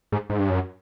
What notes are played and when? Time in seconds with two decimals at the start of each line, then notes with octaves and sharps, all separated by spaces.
0.12 G#2
0.30 G#2
0.39 G2
0.49 F#2